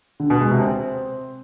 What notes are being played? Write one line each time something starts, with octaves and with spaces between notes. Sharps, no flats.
D3
B2
G#3
C3
C4